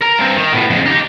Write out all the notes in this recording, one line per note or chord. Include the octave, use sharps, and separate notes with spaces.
A#4 A#5
G2 C4
D#3
A2 B3
F2 C#3
D#4 G4